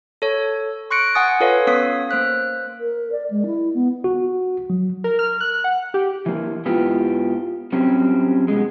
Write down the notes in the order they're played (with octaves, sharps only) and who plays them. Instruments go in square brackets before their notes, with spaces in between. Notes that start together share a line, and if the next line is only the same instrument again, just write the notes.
[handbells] A4 C#5
C6 C#6 F#6 A#6 C#7 D7
F#5 G#5 D#6 A6
F4 A4 B4 C#5 F5
B3 C#4 C#5 F5 D#6 B6
A#3 C5 F#6 B6
[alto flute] A#4
D5
G#3
E4
B3
[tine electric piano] F#4
F#3
[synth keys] A#4
F6
F#6
F#5
G4
[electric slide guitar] E3 A#3
G#2 B3 E4 F4 G4
F#3 G3 C4 C#4 G4
B2 G#3